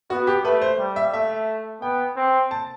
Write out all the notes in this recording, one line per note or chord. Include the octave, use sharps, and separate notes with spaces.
B3 F#4
G4
A3 B4
C5
G3
E5
A3 E5
B3 G5
C4
A5